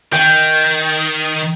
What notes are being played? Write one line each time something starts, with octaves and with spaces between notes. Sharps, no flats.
D#3 G5